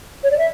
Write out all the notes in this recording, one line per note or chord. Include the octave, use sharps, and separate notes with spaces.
C#5
D5
E5